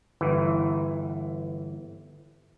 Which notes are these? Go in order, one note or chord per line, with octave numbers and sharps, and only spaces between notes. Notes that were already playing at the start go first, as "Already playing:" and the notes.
G1 E3